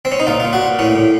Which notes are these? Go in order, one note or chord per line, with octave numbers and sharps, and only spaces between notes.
C4
C#4
D#4
A#2 F4
A#2 F4
F#4
A#2
A2 C#4
A2